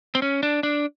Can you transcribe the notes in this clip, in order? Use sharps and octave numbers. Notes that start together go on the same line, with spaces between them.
C4
C#4
D4
D4